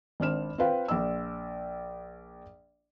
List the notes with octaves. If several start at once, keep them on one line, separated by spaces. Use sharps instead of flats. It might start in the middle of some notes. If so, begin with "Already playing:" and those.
G#1 C4 D4 F6 E7
C4 F4 B4 F5 G5
A#1 D5 E6